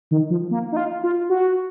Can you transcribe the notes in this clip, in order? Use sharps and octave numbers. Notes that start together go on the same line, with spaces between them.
D#3
F3
A#3
D#4
F4
F4
F#4